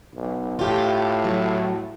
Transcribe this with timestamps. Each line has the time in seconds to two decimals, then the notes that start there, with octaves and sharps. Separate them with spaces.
0.13 B1
0.59 A2 F4 G4
1.25 F#3